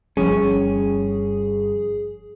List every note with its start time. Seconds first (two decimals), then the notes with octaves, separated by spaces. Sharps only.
0.17 G1 F3 G3 C#4 G#4